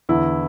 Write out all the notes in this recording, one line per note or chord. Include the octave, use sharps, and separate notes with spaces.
E2 D3 E4